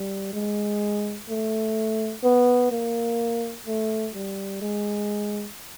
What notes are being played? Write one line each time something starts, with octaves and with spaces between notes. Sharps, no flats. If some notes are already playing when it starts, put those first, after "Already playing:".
Already playing: G3
G#3
A3
B3
A#3
A3
G3
G#3